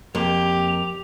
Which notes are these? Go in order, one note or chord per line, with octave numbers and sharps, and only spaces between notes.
F2 A#3 G4 F7